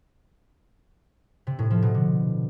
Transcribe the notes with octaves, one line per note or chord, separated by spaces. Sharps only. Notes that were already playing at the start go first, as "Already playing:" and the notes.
C3
A2
F3
B2
D3